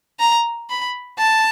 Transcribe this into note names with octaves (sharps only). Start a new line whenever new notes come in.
A#5
B5
A5